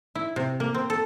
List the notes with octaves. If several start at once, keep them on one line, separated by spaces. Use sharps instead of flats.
E4
C3
A#3
C4
A4